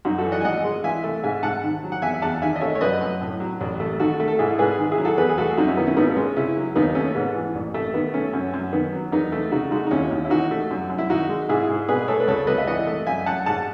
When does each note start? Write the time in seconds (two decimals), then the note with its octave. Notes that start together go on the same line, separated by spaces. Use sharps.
0.05 F#2 D#4 F#4
0.18 F#4 A4
0.25 E3
0.32 D#5 F#5
0.41 G#5
0.45 G#1 D#5 F#5
0.64 G#3
0.84 E3 E5 G#5
1.04 A3
1.23 G#2 E5 G#5
1.43 G#2 F#5 A5
1.64 D#3
1.83 F#3
1.92 F#5
2.02 E2 E5 G#5
2.22 E2 F#5 A5
2.42 D#3 E5 G#5
2.56 D#5
2.61 A3 C#5 E5
2.75 C#5
2.81 F#2 B4 D#5
3.01 F#2
3.21 A2
3.40 F#3
3.61 A1
3.80 A3
4.00 D#3 F#4 A4
4.20 A3
4.28 A4
4.39 G#2 E4 G#4
4.59 G#2 G#4 B4
4.79 D#3
4.92 E4 G#4
4.98 F#3
5.05 F#4 A4
5.17 E2 G#4 B4
5.29 G#4
5.38 A3 F#4 A4
5.57 F#2 D#4 F#4
5.67 C#4 E4
5.77 D#3 B3 D#4
5.87 C#4 E4
5.97 G#1 B3 D#4
6.10 B3
6.16 G#3 C#4
6.36 C#3 C#4 E4
6.56 F#3
6.76 D#2 B3 D#4
6.95 A3 C#4
7.15 G#2 B3
7.35 E3
7.55 A1
7.74 A3
7.94 D#3 B3
8.14 A3 C#4
8.33 F#2 C#4
8.54 F#2
8.72 D#3 B3
8.93 F#3
9.12 E2 B3 D#4
9.32 A3
9.51 C#3 D#4 F#4
9.71 G#3 D#4 F#4
9.87 D#4
9.91 D#2 C#4 E4
10.11 D#2
10.25 E4
10.30 E3 D#4 F#4
10.51 A3
10.71 F#2
10.90 F#2
10.98 E4
11.10 D#3 D#4 F#4
11.29 G#3
11.49 G#2 E4 G#4
11.69 G#2
11.88 B2 G#4 B4
12.08 A3 A4 C#5
12.20 B4
12.27 C#2 A4 C#5
12.47 C#2 B4 D#5
12.58 E5
12.67 E3 D#5 F#5
12.87 A3
13.06 F#2 E5 G#5
13.26 F#2 F#5 A5
13.46 G#2 F#5 A5